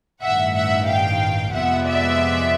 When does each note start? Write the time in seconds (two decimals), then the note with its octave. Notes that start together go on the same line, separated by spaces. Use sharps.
0.23 A1 G2 D#3 E5 F#5
0.55 E5 F#5
0.88 F5 G5
1.54 F2 C3 F3 G#3 B3 E5 F#5
1.86 D5 E5